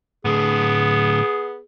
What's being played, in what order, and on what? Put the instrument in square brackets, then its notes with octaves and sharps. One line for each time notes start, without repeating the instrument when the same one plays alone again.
[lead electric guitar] A2 D3 [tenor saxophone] B3 [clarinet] G#4